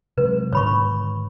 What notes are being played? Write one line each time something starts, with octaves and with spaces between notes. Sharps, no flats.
C3 F#3 G#3 B4
G#2 D3 D#3 C#5 B5 C#6